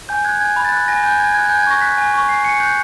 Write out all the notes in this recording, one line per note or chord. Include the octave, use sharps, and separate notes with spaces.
G#5 G6
F#6 G#6
G#5 G#6
B5
A6
F#6
G#5 A#6
G#5 G6
G#5 G#6
F#6 G#6
G#5 G6
G#6
C#6 A#6
F#6 B6
G#5
C#6
G#5 C7
G#5 C#7
F#6 G6